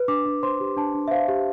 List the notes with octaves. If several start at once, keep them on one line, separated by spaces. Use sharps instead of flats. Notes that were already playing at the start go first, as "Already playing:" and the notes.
Already playing: B4
D4 D6
D4
C5 C6
G4
D4 A5
D4
E5
C5 F5
G4